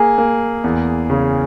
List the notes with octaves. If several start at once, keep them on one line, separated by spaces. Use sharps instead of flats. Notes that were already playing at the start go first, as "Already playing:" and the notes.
Already playing: A#3 G#4
A#3
E2
C#3